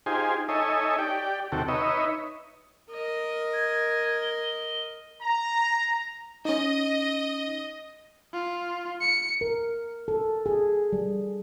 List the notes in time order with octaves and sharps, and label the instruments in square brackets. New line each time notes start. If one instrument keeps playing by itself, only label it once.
[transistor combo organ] D#4 F4 G4 G#4 C5 G#5
D#4 A4 C#5 D#5 E5 G#5
G4 D5 G5
D#2 C3 F#4 A4 G5
D#4 B4 C#5 D#5 E5
[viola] A#4 D#5
[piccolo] G#6
G7
[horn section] A#5
[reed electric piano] C#4 D#4 [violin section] D#5
[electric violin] F4
C#7
[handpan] A#4
A4
G#4
G3